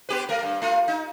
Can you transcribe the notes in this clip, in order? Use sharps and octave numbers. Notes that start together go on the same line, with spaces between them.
B3 G4 B4
A3 A#4
G2
A3 F4
D#4